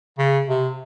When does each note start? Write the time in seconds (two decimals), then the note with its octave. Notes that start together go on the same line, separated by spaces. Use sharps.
0.18 C#3
0.49 C3